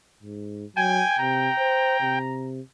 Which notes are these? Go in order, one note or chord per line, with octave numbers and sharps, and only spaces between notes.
G#2
F#3 G5 G#5
C3 A#5
C5
C3